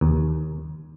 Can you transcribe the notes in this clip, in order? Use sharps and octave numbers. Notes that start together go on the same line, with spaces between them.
D#2